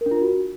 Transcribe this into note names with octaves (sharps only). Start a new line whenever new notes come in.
A#4
D4
F4
A#4
F#4